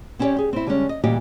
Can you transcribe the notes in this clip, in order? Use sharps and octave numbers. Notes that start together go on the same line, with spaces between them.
C4 C#4 E4 G4 C#5 D5
G4 G#4
C4 E4
D3 G3 G#3 C4 C#4
D#5
D2 A#2 E3 G3 G4 D#5